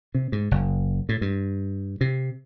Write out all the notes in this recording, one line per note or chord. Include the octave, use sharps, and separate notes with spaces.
C3
G#2
F#1
A2
G2
C3